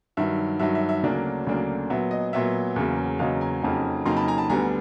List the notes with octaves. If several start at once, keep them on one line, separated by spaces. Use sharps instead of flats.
G2 D#3 F#3 E5
G2 D#3 F#3 E5
E5
E5
D2 C#3 F#3 A#3 D4
D2 C#3 F#3 A#3 D4
A#2 F#3 B3 E5
D#5
A#2 F#3 B3 E5
E2 C#3 F#3 A#3
E2 C#3 F#3 A#3 D#5 F5
G#5 A#5
F2 C#3 F#3 A#3 D#4
F2 C#3 F#3 A#3 D#4 A#5 C6
A5 B5
G#5 A#5
A5 B5
D2 D3 G3 B3 G#5 A#5